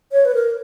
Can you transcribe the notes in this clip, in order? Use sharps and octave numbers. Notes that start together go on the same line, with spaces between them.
C#5
B4
A#4